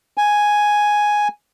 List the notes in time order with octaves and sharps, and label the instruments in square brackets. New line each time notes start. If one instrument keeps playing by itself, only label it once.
[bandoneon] G#5